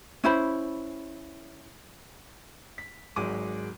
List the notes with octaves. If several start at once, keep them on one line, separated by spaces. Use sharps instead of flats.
C#4 E4 C5 B5
B6
G#1 F#3 G#3 D6 D#7